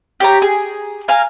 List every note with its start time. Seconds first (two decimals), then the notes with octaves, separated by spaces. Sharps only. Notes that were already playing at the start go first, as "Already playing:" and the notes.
0.20 G4 C#5 A#5
0.42 G#4
1.08 A#4 F5 G#5